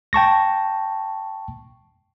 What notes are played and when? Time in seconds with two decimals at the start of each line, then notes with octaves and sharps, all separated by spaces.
0.13 G5 A5 C#6 A#6